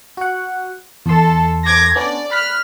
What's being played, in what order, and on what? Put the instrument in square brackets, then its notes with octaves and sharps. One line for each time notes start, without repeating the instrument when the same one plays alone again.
[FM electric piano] F#4 F#5
[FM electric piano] E2 C6 [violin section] A4
[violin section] D6 G#6 A#6
[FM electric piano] B3 C#4 D4 [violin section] D5
[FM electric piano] B5 F#6 B6 [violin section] F6